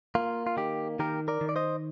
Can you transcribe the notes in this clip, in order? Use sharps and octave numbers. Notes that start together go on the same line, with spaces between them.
A#3 F4
F4
D#3 G4
D#3 G4 A#4
A#4 D5
D#3
D5
C5 D#5